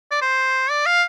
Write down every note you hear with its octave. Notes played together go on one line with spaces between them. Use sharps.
D5
C5
D5
F5